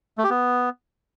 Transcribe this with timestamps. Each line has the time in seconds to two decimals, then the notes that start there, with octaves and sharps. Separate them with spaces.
0.18 A3
0.24 G4
0.30 B3